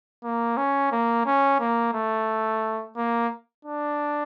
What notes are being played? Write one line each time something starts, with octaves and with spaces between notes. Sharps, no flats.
A#3
C#4
A#3
C#4
A#3
A3
A#3
D4